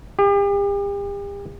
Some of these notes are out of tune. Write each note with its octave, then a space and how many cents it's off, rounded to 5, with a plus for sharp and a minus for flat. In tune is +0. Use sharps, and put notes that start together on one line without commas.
G4 +40